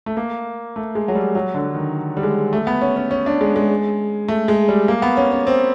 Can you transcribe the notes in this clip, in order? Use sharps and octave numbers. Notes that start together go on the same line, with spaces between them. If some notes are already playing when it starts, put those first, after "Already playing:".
A3
A#3
A3
G#3
F#3
G3
F#3
D3
D#3
G3
G#3
A3
B3
C#4
C#4
C#4
D4
G#3
G#3
A3
G#3
G3
A#3
B3
C#4
C#4
C4